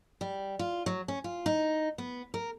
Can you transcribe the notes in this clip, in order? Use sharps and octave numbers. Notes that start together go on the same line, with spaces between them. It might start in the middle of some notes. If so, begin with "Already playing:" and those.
G3
F4
F#3
C#4
F4
D#4
B3
A#4